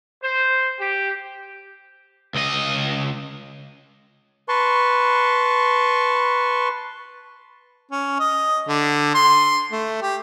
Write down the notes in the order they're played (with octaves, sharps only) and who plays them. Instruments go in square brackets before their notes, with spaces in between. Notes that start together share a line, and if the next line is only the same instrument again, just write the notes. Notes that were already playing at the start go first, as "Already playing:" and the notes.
[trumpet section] C5
G4
[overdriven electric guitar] C#2 D#5
[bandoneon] B4 A5 C6 C#6
[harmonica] C#4
D#5
D3
C6
A3
G4